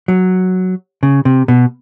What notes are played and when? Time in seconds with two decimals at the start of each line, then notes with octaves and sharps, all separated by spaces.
0.08 F#3
1.03 C#3
1.25 C3
1.48 B2